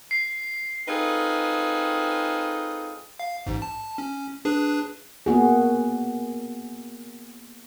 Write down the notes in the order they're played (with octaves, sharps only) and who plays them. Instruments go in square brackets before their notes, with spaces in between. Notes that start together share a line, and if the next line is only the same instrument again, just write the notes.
[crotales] C7
[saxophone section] C4 D#4 F4 G#4 A4 B4
[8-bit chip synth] F5
A1 G#2
A5
C#4
D4 G#4 B4
[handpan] A#3 B3 F#4 G#4